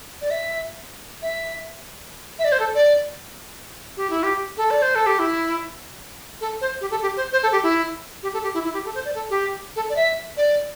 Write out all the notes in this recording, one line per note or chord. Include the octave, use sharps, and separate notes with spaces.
D5
E5
E5
E5
D5
C5
A4
D5
G4
E4
G4
A4
D5
C5
A4
G4
E4
A4
C5
G4
A4
G4
C5
C5
A4
G4
E4
G4
A4
G4
E4
E4
G4
A4
C5
D5
A4
G4
A4
D5
E5
D5